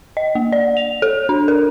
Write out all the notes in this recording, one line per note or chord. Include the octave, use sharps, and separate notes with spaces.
D#5
A#3
D5
F7
A4
D4
A#4